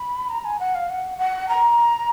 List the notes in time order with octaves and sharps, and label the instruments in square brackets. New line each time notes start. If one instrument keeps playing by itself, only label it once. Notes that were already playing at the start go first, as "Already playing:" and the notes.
Already playing: [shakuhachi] B5
A#5
G#5
F#5
F5
F#5
F#5
A#5